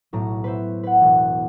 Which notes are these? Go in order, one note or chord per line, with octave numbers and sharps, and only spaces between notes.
B1 A2 A#5
B4 C5 E5
B4 F#5
E1